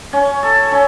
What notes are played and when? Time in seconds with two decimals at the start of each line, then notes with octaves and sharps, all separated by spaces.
0.13 C#4
0.43 A4
0.72 C#4